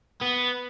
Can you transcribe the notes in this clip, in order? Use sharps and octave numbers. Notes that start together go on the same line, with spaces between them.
B3